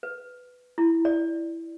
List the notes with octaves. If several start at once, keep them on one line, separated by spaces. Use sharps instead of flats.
B4
E4
D5